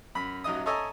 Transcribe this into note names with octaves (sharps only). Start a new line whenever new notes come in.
F#2 B5
A1 F#3 D#4 D#5 D#6
A4 C#5 D#5 E5 G#5 A#5